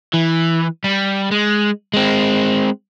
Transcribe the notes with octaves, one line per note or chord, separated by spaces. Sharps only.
E3
G3
G#3
G#3 C4